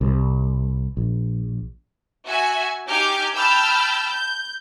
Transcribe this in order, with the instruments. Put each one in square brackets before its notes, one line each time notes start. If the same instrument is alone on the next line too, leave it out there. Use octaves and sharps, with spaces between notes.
[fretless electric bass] C2
A#1
[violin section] F#4 E5 G#5
D#4 G4 G#5 D6 F6 G6
G5 A5 B5 E6 F6 G6
G6